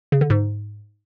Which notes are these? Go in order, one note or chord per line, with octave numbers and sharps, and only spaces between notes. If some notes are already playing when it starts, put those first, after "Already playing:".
C#3
D3
G#2